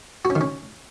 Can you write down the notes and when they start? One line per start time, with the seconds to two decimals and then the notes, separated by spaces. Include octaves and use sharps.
0.25 F#4
0.30 C#4
0.36 D#3
0.41 C#4